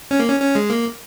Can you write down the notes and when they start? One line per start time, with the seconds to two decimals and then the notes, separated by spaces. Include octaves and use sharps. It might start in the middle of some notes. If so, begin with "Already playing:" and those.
0.11 C#4
0.19 A#3
0.28 C#4
0.41 C#4
0.55 G#3
0.70 A#3